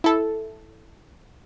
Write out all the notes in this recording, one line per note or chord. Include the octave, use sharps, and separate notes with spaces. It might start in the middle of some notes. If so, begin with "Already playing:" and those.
E4 A4